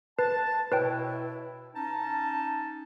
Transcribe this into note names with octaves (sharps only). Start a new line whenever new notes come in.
B4 A5
B2 E4 B4 C#5 G5
C#4 D#4 A5